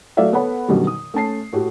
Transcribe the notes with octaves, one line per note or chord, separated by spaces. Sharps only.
F#3 A3 A4 D5 E5 F5
B3 A4 C#5 F#5 B5
F#2 B2 D3 D#3 G3
D#6
A3 C#4 A5 C7
A2 F#4 G4 A4